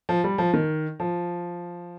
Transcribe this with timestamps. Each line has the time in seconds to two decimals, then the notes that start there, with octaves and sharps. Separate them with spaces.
0.09 F3
0.24 G3
0.38 F3
0.54 D#3
1.00 F3